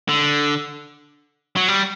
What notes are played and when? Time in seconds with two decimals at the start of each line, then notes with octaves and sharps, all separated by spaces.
0.09 D3
1.56 F#3
1.68 G3